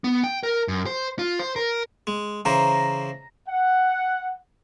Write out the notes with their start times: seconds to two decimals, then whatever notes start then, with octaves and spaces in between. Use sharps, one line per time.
0.04 B3
0.24 G5
0.43 A#4
0.68 F#2
0.86 C5
1.19 F4
1.39 C5
1.56 A#4
2.07 G#3
2.45 C#3 E3 C5 A#5
3.49 F#5